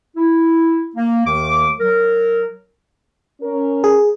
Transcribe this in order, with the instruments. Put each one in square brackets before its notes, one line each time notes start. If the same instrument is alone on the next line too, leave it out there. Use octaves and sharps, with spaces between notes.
[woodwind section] E4
A#3
D#2 D#3 A3 D6
F#3 A#4
[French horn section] C#4 A#4
[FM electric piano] G#4